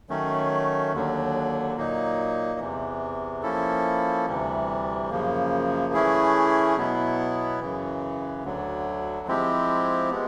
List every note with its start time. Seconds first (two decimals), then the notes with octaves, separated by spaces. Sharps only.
0.09 D#3 F#3 A3 C#4
0.93 D#2 D3 F#3
1.76 A#2 F#3 A#3 D#4
2.60 E2 C3 E3
3.43 F3 A#3 C#4 E4 A4
4.27 D2 C3 E3 G3
5.10 F#2 C#3 F3 A#3
5.93 E3 A3 C#4 E4 G#4
6.77 B2 F#3 B3 E4
7.60 F#2 C#3 E3
8.43 D2 D3 F#3
9.27 F3 G#3 C4 E4 G4
10.11 G#3 B3